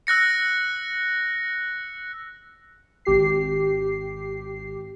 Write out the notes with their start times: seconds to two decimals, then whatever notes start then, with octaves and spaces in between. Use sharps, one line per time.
0.07 E6 F#6 A#6 C#7
3.05 G#1 G4 C7